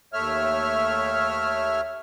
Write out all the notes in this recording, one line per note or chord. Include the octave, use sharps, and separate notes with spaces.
D#2 A3 C#5 E5 F6